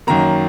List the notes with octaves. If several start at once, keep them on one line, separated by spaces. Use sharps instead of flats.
F#2 D#3 F#3 A#3 A#5